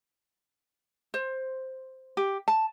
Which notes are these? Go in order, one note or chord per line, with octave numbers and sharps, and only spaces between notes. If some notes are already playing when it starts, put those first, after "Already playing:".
C5
G4
A5